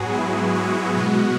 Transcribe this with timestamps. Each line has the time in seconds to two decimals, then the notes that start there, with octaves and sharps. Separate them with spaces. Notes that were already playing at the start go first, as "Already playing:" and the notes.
Already playing: G#2 F#3 B3 F#4 G#4
0.13 E4
0.55 F#4
0.97 B2 G#3 B3